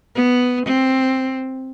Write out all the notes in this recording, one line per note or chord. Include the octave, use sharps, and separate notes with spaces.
B3
C4